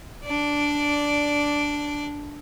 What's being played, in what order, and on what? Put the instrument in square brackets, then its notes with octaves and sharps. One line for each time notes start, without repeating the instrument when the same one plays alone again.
[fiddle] D4 D5